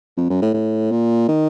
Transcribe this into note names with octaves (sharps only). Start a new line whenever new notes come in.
F2
F#2
A2
A2
A#2
D#3